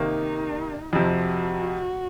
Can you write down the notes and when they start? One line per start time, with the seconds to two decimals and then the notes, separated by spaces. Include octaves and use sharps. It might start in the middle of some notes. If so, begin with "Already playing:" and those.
Already playing: C3 D#3 A#3 D#4
0.92 F2 C3 F3 F#4